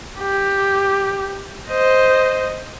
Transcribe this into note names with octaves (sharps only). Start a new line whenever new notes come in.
G4
C5 D#5